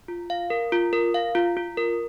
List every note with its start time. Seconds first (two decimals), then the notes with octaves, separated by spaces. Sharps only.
0.08 F4
0.30 F5
0.50 A#4
0.72 F4
0.93 A#4
1.14 F5
1.35 F4
1.57 F4
1.77 A#4